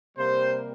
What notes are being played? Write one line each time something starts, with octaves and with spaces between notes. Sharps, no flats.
C3 G3 A#3 C5